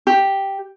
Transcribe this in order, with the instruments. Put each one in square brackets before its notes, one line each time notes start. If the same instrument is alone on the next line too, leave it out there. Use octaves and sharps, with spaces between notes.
[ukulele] G4